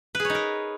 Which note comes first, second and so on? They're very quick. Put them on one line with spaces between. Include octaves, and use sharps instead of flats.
B4 G#4 C#5 D#4 A#4